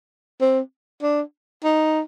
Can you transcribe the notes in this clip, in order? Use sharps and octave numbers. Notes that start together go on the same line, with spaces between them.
C4
D4
D#4